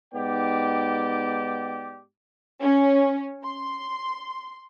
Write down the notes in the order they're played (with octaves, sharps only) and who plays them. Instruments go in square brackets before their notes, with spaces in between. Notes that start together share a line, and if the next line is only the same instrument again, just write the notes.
[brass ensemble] G#2 B3 D#4 G4 D5 G5
[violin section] C#4
C6